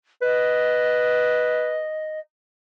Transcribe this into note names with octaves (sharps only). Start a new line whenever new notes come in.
B4 D#5